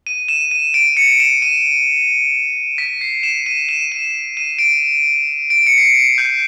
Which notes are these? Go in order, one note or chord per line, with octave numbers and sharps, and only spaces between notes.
D#7
E7
D#7
D7
C#7
E7
D#7
B6
C7
E7
D#7
E7
D#7
D#7
D7
D7
C#7
C7
C#7
G6